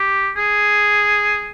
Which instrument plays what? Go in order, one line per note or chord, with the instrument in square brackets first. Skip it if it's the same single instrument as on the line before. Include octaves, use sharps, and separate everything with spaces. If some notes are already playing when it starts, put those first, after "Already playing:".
Already playing: [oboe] G4
G#4